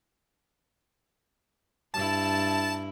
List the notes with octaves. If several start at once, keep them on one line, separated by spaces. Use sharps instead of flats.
G2 E4 A5